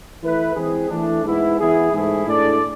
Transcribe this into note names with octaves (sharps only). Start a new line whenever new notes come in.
E3 A3 E4 B4
E3 G#3 C4 G#4
E3 A3 D4
G#2 G#3 B3 E4
E3 B3 E4 G#4
G#2 E3 A3 E4 G#4
A2 G#3 D4 A4 D5